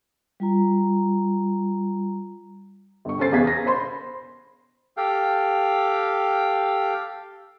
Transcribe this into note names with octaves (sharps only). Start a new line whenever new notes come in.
G3 F4 A#5
G1 C#6
C#4 A4 C5 A6 C7
E2 B3 G#4 F5 G#6 B6
A#6
C5 B5 C6
G4 A4 F5 G5